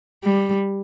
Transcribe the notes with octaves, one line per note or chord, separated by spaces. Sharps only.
G3